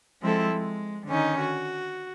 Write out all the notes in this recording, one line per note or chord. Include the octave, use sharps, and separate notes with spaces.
F3 G#3 C4 E4 A4
G#3
D3 D#3 C#4 D#4
F#4